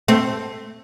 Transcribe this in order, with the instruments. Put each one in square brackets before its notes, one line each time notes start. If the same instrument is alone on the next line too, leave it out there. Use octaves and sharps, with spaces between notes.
[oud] A3 C4